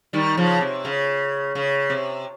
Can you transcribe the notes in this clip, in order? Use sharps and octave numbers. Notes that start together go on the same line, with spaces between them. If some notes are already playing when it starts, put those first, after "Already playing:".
D#3 G3
C#3 F3
C3
C#3
C#3
C3